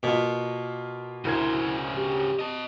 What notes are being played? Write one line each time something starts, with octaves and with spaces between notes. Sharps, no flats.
B2 A#3 F4
D2 C#3 E4 A#4 C5 G#6
G4
D#5 A5